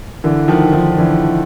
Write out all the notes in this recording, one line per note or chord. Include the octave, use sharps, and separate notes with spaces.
D3 E3
D#3 F3
D#3 F3
D3 E3